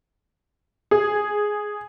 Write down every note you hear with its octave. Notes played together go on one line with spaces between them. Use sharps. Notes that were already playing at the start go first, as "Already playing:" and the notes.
G#4